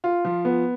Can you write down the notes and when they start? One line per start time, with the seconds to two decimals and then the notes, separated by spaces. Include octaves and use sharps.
0.04 F4
0.25 F3
0.45 B3